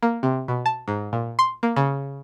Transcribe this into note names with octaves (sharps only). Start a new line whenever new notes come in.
A#3
C3
B2
A5
G#2
A#2
C6
A#3
C#3